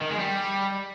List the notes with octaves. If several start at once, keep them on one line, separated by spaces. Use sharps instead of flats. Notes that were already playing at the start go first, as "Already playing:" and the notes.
D#3
G#3
G3